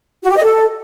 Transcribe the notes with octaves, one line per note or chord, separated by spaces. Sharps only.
F#4
G4
D#5
A4